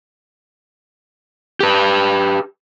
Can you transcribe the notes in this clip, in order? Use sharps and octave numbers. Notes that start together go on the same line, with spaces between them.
G4 B4